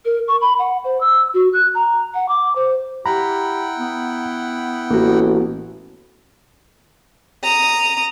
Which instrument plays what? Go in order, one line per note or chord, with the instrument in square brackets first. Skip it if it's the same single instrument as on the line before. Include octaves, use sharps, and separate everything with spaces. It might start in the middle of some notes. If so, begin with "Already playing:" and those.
[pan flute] A#4
C#6
B5
F#5
C5
E6
F#4
F#6
A#5
F#5
D6
C5
[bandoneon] E4 F#5 G5 [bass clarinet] G4 [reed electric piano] A#5 B5
[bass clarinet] B3
[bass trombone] A1 [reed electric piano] A#3 F#4
[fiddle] A#5 D#6